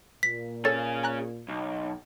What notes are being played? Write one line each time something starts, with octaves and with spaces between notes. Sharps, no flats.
A#2 B6
C#4 G#4 A4 C#5 A6
G#5 A#5 F#6
B1